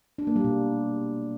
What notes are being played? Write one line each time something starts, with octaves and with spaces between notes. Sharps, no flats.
D4
A#3
G3
B2